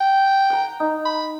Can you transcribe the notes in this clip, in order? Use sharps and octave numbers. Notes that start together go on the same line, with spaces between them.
G5
F#5 A#5
D#4
B5